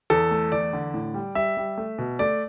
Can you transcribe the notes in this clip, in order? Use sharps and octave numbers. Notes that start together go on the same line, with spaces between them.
E2 A4
A3
E2 D5
D3
A2
G3
G3 E5
G3
A3
B2
A3 D5